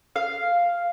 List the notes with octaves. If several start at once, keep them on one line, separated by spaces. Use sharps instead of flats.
F5